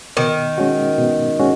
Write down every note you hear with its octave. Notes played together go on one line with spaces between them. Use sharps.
B2 D#3
G#3 C#4 F#4
B2
G#3 C#4 F#4